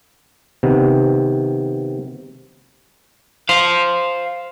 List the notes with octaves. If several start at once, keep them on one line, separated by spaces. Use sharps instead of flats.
C3 D#3 B3
C5 F5